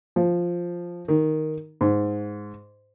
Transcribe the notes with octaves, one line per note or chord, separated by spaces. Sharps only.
F3
D#3
G#2